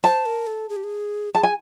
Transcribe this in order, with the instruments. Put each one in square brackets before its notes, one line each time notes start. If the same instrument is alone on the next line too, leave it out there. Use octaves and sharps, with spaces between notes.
[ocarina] C5 [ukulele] A5
[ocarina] A#4
A4
G#4
G4
G#4
[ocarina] G#4 [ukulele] A5
[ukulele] G#5